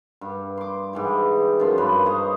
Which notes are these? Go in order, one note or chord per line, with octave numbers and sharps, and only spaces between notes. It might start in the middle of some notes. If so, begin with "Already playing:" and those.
G2
C6 D6
G#2 E3 G4
F#2 F3 C6
G2 B4
C5 C#5 D#5 A#5